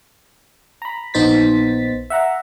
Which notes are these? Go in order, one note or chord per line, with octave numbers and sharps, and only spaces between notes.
A#5 B5
A#1 B3 D#4 C5 A6 B6
E5 F#5 A#5